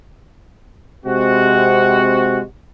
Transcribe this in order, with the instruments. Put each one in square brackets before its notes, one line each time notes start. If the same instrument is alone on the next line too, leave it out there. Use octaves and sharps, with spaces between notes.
[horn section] C3 G#3 C4 F#4